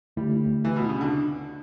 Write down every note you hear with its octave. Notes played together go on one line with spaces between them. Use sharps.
D2 D3 G3 A3 E4
E3
B2
C#3
D3